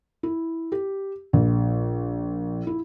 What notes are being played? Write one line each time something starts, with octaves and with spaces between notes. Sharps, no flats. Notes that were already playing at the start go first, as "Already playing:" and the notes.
E4
G4
A#1
E4